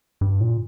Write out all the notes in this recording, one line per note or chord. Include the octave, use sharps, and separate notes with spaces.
G2
A#2